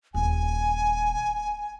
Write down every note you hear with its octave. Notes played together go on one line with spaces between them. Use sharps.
D#1 G#5